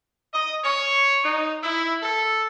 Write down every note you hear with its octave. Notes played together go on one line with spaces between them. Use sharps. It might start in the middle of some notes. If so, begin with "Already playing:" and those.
D#5
C#5
D#4
E4
A4